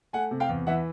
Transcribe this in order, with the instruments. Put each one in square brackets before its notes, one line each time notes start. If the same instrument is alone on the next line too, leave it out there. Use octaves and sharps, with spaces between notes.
[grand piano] A3 F#5 G#5
C3
F5 G5
E2
E3 E5 F#5